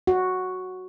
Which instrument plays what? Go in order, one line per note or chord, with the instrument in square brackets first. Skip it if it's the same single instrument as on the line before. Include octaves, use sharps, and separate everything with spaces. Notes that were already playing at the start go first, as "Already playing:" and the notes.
[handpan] F#4